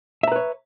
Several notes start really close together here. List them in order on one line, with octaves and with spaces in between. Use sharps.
E5 A#5 B4 C#5